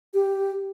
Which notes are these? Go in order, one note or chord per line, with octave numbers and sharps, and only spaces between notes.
G4